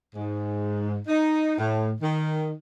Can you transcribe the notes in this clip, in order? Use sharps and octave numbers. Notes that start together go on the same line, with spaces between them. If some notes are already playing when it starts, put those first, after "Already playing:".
G#2
D#4
A2
D#3